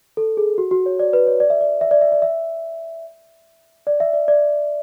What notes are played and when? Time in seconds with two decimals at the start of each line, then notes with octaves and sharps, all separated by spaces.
0.17 A4
0.37 G#4
0.58 F#4
0.71 F#4
0.86 C#5
0.99 D5
1.13 B4
1.27 C#5
1.40 D5
1.50 E5
1.61 D5
1.81 E5
1.91 D5
2.01 E5
2.12 D5
2.22 E5
3.87 D5
4.00 E5
4.13 D5
4.28 D5